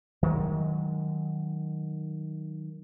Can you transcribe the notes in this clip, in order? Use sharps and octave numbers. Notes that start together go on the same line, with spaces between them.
D#3 F#3 G#3